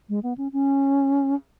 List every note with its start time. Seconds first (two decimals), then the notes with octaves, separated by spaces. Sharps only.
0.09 G#3
0.23 B3
0.38 C#4
0.53 C#4